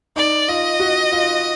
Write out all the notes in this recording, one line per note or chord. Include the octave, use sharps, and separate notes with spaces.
D#4 D5
F4 D#5
F#4
F4